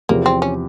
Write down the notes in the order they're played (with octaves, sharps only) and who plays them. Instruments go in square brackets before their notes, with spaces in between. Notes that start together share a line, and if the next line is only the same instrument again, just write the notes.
[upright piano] E2 C3 F3 [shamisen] A#3
[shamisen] C4
C#4